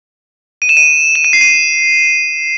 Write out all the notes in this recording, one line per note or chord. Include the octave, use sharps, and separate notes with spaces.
D#7
E7
D#7
E7
D#7
C7
D#7